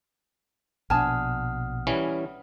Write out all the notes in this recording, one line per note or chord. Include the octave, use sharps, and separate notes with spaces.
A#1 B2 D4 F#5 G#5 A5 D#6 F6
E3 G3 C#4